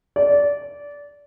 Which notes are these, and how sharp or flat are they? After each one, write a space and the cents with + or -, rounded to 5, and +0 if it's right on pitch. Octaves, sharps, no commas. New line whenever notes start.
D5 -20